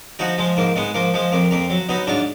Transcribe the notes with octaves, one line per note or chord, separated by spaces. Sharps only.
F3 D#4 F#4
F3 G#3
G#2 A#3
G#2 G#3 B3
F3 A#3
F3 G#3
F2 A#3
F2 A#3
F#3
F#3 B3 D#4
G#2 D4 F4